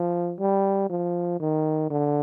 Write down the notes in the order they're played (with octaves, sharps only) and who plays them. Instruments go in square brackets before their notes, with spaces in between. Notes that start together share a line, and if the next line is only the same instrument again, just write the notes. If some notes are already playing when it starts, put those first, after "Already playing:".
Already playing: [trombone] F3
G3
F3
D#3
D3